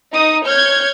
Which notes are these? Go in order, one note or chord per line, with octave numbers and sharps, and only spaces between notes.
D#4 D#6
C#5 F6 G6 G#6